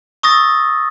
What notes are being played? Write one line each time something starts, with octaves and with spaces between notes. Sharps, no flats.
C#6 D#6 E6 A6 A#6